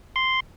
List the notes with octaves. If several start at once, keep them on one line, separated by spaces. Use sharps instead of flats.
C6